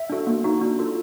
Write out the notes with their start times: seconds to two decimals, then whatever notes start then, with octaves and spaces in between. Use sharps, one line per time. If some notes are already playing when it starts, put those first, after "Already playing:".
Already playing: E5
0.10 D4 F#4 A4
0.27 A#3
0.44 D#4 F#4
0.61 D4
0.79 F4 A4